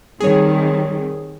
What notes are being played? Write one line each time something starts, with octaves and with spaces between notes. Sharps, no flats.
D#3 G3 C4 G#4 C#5